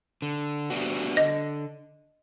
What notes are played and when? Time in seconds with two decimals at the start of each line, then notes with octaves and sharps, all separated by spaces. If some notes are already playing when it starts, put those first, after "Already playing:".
0.22 D3
0.70 G3 B3 D4 F#4
1.17 D3 D#5